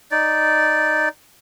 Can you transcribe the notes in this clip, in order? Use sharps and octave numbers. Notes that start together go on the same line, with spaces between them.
D#4 D5